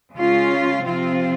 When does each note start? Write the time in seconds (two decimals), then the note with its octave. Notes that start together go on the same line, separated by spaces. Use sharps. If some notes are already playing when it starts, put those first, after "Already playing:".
0.14 C#3 G#3 C#4 F4
0.83 C3 F3 C4 F4